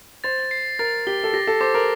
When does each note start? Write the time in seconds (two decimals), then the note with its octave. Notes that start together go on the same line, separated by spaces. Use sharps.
0.24 C5 A6
0.51 C7
0.79 A#4 A6
1.07 G4 G7
1.24 A4
1.33 G4 A#6
1.47 A4
1.60 C5 D6
1.74 A#4